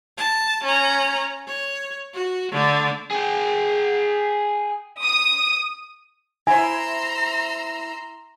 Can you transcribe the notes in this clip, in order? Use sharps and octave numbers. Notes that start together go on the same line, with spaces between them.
A5
C#4 A#5
C#5
F#4
D3 A3
G#4 G5
D#6
E4 C5 G#5 A#5 C6 E6